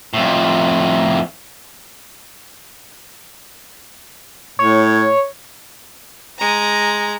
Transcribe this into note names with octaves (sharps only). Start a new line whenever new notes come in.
F2 A2
A2 C#5
G#3 A#5